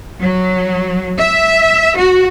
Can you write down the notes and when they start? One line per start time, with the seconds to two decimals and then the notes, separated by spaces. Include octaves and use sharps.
0.21 F#3
1.18 E5
1.97 F#4